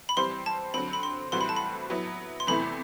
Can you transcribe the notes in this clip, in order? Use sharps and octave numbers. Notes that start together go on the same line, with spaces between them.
B5
E3 G3 C4 G4 C5 C6
A5
D3 F#3 C4 B5
B5
C6
A2 E3 G3 C4 F#4 C6
B5
A5
B5
F#3 B3 E4
C6
E2 C3 E3 A3 E4 B5